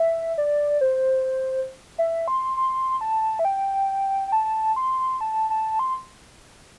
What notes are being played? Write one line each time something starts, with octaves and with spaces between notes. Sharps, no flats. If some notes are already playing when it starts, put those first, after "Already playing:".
Already playing: E5
D5
C5
E5
C6
C6
A5
E5
G5
G5
A5
C6
A5
A5
C6